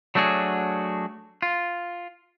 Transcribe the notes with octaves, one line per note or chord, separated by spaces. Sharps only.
F#3 A3 D4 F#4 G#4
F4